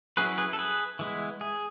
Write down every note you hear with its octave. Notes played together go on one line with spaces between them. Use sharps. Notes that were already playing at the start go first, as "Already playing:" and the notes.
F#3 C#4 E4 G#4 B4
G#4 B4
A4
G#4 B4
E3 G#3 B3 E4
G#4